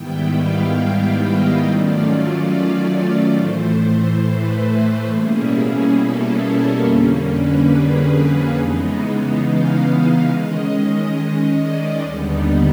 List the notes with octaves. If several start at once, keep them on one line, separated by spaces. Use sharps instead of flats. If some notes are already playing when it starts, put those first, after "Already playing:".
Already playing: G#2 D#3 G3 B3 E4 G5
F5
D#5
D#3 F#3 A3 C#4 F4 D5
D5
D5
A2 E3 A3 C5
B4
B2 G3 A#3 C#4 E4 G#4
A4
A#4
F2 D3 G3 A#3 C#4
B4
G#4
C#3 E3 G#3 B3 D#4
F5
D#3 G#3 C#4 D#5
D#5
D5
D#2 D3 G3 B3 D#4